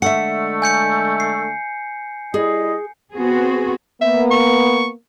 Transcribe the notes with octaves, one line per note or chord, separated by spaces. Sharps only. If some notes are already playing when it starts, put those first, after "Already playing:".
D3 G#3 A3 E5 F#5 C#7
G#5 G6 C#7
C7
G3 E4 G#4 D#5
B3 C4 F#4 G#4
A#3 B3 E5
C#6